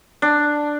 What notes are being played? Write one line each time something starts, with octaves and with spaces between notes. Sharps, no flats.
D4